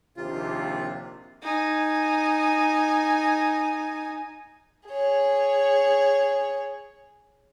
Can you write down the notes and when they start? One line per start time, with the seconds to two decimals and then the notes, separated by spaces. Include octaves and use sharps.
0.17 A#1 D#2 C3 F4
1.43 D#4 G#5
4.89 G#4 C#5